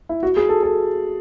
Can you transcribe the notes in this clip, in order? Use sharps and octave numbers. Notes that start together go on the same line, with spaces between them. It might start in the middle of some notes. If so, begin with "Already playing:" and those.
E4
F#4
G#4
A4
A4